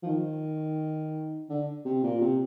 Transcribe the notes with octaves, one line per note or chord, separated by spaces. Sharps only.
F3
D#3
D3
C3
A#2
C3